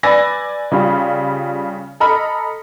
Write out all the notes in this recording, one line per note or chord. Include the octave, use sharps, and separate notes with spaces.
B4 D5 G#5 E6 A#6
C#3 G3 F4
A4 D#5 A#5 B5 F6